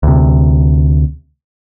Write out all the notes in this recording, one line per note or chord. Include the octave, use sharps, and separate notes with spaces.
D2 C3